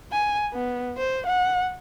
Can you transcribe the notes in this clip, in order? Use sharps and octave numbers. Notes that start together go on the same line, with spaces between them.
G#5
B3
C5
F#5